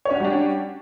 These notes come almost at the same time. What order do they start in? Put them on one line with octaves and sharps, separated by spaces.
C#5 C#4 F#4 G3 D4